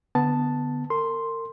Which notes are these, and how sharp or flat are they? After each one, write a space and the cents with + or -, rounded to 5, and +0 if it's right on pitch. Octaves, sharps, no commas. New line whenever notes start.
D3 +0 B3 +0 A5 +0
A#4 -35 C6 +0